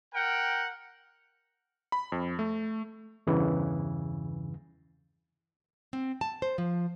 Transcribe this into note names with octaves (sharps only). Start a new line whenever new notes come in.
A#4 F#5 G5
B5
F2
A3
E2 G2 C#3 E3
C4
A5
C5
F3